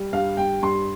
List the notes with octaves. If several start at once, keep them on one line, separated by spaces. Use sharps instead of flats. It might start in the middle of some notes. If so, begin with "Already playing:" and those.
Already playing: G3
G2 F5
G3 G5
G2 C6